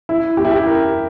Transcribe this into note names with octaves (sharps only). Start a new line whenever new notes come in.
E4
G4
E4
G4
A#4